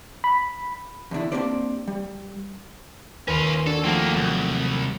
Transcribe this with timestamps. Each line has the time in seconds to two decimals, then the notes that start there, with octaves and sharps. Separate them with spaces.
0.24 B5
1.11 E2 D3 D4 E4
1.32 A#3 C4 D4 G4 C5 D5
1.88 G3
3.28 D#2 C#4 F4 B4
3.67 D4 F#4 A4 G#6 D#7
3.84 F3 A3 A#3 C4 G#4 F#5 A5
4.16 C2 F#3